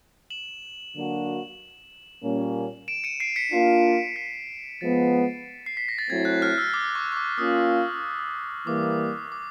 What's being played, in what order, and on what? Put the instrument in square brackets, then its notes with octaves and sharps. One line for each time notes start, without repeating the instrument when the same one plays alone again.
[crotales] E7 F#7
[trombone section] D3 F#3 A#3 D4 F#4
A#2 G3 A#3 C#4
[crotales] D7 E7
C#7 D#7
C7 D7
B6 C#7
[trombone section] A#3 D4 F4 [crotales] C7
[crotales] B6
[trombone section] F3 G#3 B3 [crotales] A6
[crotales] C7
B6
A#6
A6
[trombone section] F#3 A3 C4 E4 [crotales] G#6
[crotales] F#6
F6
E6
D6
C#6
C#6
D6
[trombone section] A#3 C#4 F4 [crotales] D#6
[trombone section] E3 G3 A#3 [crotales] D6
[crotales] D6